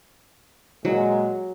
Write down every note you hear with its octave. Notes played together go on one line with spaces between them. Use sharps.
A#2 F#3 G#3